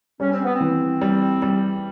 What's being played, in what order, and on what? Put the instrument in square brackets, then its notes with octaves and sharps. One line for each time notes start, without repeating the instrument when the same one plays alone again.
[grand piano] G3 [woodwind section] C#4
[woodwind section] C4
B3
C4
[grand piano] E3
G3
G3